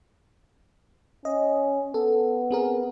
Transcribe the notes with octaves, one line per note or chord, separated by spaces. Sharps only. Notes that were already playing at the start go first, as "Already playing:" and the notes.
C#4 D#5
B3 A4
C4 G#4 A#4